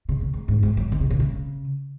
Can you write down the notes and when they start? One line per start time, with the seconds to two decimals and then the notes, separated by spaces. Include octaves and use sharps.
0.09 C#3
0.21 A#2
0.33 G#2
0.48 G#2
0.63 G#2
0.77 F#3
0.92 D#3
1.01 C#3
1.10 A#2
1.20 C#3